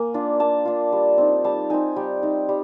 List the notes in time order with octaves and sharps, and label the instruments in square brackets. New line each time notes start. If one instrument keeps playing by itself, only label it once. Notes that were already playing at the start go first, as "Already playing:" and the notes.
Already playing: [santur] A#3 G#5
D4 F4
A#3 A5
D4 F4
G3
C4 D#4
G3 A5
C4 D#4 G#5
G3 G5
C4 D#4
G3